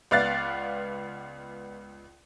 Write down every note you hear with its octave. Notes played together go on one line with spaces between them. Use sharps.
C#2 B3 D5 F5 F#6 A6